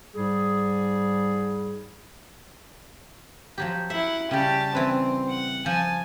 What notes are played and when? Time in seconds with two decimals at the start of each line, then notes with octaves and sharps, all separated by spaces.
0.16 G#2 G3 G#4
3.58 F3 F#3 G4
3.90 E4 E5 F#5
4.31 C#3 G3 G4 A5
4.75 E3 C4 B4
5.29 F#5
5.66 F3 G#5 A5